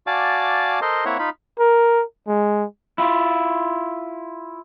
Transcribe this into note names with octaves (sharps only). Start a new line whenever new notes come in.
F#4 D5 F5 G#5 A5 D6
A4 A#4 C5 D#5 C6
A#3 C4 E4 C#5 E5 F#5
D#4 F4 B5
A#4
G#3
E4 F4